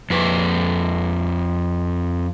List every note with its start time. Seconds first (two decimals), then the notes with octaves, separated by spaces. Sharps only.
0.10 F2 B4